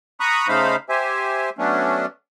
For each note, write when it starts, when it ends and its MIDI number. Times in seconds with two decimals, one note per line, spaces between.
0.20 0.48 82
0.20 0.48 83
0.20 0.48 85
0.20 0.48 87
0.20 0.48 90
0.48 0.76 49
0.48 0.76 57
0.48 0.76 63
0.48 0.76 72
0.48 0.76 77
0.48 0.76 83
0.89 1.49 67
0.89 1.49 72
0.89 1.49 76
0.89 1.49 80
1.58 2.06 54
1.58 2.06 57
1.58 2.06 59
1.58 2.06 61
1.58 2.06 62